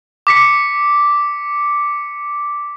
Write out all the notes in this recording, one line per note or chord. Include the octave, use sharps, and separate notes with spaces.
D6 B6 C#7